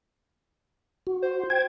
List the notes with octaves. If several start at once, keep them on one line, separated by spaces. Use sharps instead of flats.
F#4
C5
G5 G#6